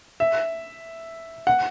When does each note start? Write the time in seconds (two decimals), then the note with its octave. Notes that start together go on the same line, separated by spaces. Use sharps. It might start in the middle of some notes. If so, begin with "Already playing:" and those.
0.20 E5
1.47 F#5